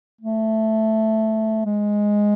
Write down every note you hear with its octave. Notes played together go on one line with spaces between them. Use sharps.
A3
G#3